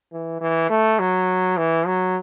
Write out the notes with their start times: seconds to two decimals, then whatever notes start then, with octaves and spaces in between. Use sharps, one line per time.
0.12 E3
0.40 E3
0.70 A3
0.99 F#3
1.57 E3
1.86 F#3